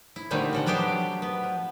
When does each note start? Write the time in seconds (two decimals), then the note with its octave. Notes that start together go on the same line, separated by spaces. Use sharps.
0.16 E4
0.31 A#2 D3 D#3 G3 A3 C4
0.53 C#3 A4 F#5
0.66 F#3 B3 D4 G4 C5 G5
1.22 B3
1.43 F3